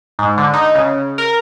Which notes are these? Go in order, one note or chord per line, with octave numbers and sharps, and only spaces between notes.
G#2
D3
D#4
C#3
A#4